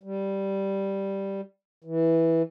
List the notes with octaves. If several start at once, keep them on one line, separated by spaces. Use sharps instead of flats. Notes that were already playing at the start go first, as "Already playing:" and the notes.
G3
E3